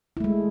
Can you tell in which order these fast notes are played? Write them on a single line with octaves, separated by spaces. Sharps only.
E4 A3 G#3